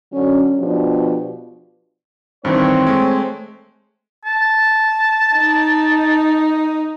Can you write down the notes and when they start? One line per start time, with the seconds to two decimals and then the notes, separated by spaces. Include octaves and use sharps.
0.12 D3 F#3 C#4
0.58 B2 F3 D4 G4
2.45 G2 D#3 E3 C4 C#5
2.87 G#3 A3
4.25 A5
5.36 D#4